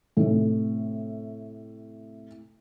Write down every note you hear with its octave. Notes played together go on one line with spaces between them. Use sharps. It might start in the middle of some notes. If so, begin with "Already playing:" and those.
A2 C3